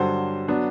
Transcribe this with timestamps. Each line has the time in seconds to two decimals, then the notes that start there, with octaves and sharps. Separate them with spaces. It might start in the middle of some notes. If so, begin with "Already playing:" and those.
Already playing: G2 D3 F#3 C5
0.48 F#3 B3 D4